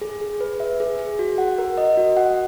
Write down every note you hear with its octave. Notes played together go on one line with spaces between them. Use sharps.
G#4
G#4
B4
E5
G#4
G#4
F#4
F#5
A#4
D#5
F#4
F#5